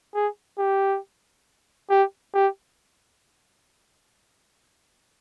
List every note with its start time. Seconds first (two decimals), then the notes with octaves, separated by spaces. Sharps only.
0.14 G#4
0.58 G4
1.90 G4
2.34 G4